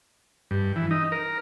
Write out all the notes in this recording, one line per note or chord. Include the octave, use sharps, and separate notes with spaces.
G2
E3
D#4
A#4